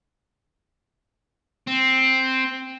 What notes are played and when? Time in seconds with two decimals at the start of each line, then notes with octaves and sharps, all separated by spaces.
1.68 C4